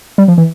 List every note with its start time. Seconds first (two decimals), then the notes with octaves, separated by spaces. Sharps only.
0.18 G3
0.28 F3
0.38 E3